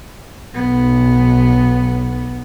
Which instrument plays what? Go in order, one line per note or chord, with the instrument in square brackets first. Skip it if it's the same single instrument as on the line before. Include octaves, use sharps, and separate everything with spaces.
[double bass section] B1 [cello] B3